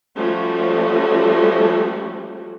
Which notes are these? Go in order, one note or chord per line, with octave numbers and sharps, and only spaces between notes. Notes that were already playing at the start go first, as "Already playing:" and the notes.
F3 G3 A3 C#4 F#4